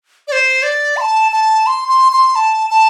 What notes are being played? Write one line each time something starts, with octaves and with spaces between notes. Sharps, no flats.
D5
C5
D5
C6
A5
A5
C6
C6
C6
A5
A5